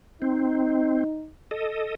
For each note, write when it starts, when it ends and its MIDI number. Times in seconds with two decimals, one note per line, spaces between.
0.22 1.04 60
0.22 1.27 63
1.51 1.95 69
1.51 1.95 75